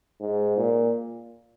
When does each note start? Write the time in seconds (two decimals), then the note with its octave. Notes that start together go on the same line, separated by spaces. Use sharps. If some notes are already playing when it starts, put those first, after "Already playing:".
0.21 G#2
0.57 A#2